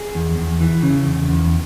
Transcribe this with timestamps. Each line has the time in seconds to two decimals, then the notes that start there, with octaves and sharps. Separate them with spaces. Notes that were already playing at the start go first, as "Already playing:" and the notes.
Already playing: G#4
0.15 E2
0.37 E2
0.61 E3
0.83 C#3
1.06 E2
1.29 E2